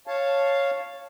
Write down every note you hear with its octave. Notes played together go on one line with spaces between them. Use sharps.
C#5 F5 A5